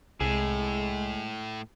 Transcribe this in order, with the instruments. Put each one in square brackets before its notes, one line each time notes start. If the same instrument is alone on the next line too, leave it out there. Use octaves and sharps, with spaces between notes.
[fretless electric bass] C2 [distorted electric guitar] A2 [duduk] G#3 [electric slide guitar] G#4